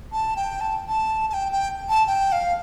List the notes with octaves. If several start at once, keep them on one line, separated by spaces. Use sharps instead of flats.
A5
G5
A5
A5
A5
G5
G5
A5
G5
F5